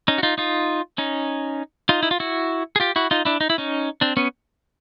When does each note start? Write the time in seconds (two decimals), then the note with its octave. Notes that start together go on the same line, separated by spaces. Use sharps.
0.08 C#4 D#4
0.18 F#4
0.23 D#4 F4
0.38 D#4 F4
0.98 C#4 D#4
1.89 D#4 F4
2.03 E4
2.11 F4
2.20 E4 F#4
2.76 G#4
2.80 F4 G4
2.96 E4 F#4
3.11 D#4 F4
3.25 D4 E4
3.41 D#4
3.50 E4
3.58 C#4 D#4
4.01 C4 D4
4.17 B3 C#4